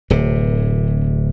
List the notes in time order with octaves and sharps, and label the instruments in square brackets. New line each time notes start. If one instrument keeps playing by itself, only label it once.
[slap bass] D1 C3